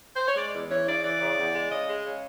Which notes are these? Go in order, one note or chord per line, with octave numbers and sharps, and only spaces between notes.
C5
C#5
G#3 D5
E2
E3 C#5
C#3 D5
E3 D5
C#3
E2
G#3
C#3 D#5
G#3
C#3